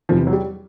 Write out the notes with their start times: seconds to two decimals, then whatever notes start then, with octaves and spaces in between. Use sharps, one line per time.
0.09 E2 C3 E3 F3
0.27 F#3
0.33 G3